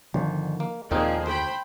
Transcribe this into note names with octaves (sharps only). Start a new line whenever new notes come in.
G1 D3 D#3 F3
A#3
D#2 A#2 F3 A#3 C4 D#4 G#4
D2 C5 G5 B5